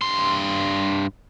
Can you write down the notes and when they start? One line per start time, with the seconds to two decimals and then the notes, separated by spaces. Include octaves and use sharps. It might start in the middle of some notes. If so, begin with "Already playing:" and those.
0.02 G2 C6